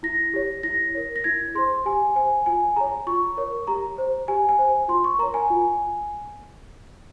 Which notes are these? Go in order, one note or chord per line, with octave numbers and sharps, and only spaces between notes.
E4 A#6
G4 C#5
E4 A#6
A#4 C#5
A#6
E4 G#6
G#4 C5 C6
G4 G#5
C5 G#5
F4 G#5
G#4 C#5 A#5
F4 C#6
A#4 C#5
G4 A#5
C5
G4 G#5
G#5
C5
F4 C6
C#6
A#4 C#5 A#5
G#5
F4